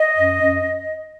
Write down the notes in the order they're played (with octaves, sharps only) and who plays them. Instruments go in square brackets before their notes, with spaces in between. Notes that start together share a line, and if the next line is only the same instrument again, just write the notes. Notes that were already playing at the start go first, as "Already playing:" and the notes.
Already playing: [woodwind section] D#5
F#2
F#2